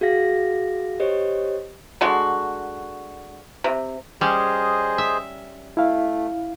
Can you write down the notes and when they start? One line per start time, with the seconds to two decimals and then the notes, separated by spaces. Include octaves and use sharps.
0.01 F#4 G#4 F5 A#6
1.00 G4 C5 C#5 D#5
2.01 D3 G#3 F#4
3.64 C3
4.21 G3 C#4 G#4 C5 D#5
4.98 E5
5.77 A3 E4 F5